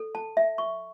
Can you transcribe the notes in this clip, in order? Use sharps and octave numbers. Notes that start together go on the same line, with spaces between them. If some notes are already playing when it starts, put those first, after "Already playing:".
Already playing: A4
A5
E5
C#6